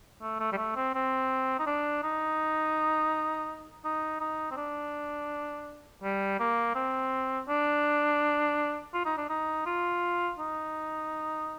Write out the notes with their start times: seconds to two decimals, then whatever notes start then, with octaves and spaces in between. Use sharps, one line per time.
0.22 A3
0.40 A3
0.52 G3
0.57 A3
0.76 C4
0.95 C4
1.59 D#4
1.67 D4
2.03 D#4
3.85 D#4
4.21 D#4
4.51 C4
4.57 D4
6.03 G3
6.40 A#3
6.75 C4
7.49 D4
8.94 F4
9.05 D#4
9.18 D4
9.29 D#4
9.66 F4
10.39 D#4